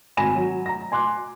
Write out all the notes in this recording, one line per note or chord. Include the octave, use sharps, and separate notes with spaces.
G#1 G#5 B5 A#6 E7
F#3
A#5 A#6
G#5 C6 D6 F#6